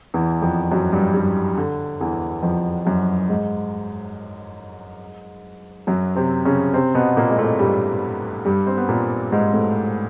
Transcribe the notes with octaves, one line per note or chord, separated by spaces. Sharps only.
E2 E3
F2 F3
F#2 F#3
G2 G3
G2 G3
D3
E2 E3
F2 F3
F#2 F#3
G#2 G#3
F#2 F#3
C3 C4
C#3 C#4
C3 C4
B2 B3
A#2 A#3
G#3
A2 A3
G2 G3
G2 G3
C4
B3
A#2 A#3
G#2 G#3
A2 A3